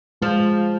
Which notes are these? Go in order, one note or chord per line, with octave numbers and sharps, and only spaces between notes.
F3 G#3